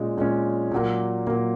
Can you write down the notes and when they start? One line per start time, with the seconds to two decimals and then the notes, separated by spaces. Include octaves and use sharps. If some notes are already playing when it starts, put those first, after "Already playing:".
Already playing: A#2 G#3 C#4
0.17 A#2 G#3 C#4
0.71 A#2 F#3 A#3
1.27 A#2 F#3 A#3